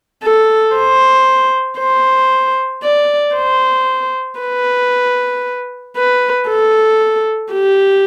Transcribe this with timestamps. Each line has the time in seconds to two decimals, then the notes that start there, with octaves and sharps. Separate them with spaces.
0.24 A4
0.76 C5
1.80 C5
2.83 D5
3.36 C5
4.41 B4
5.96 B4
6.49 A4
7.53 G4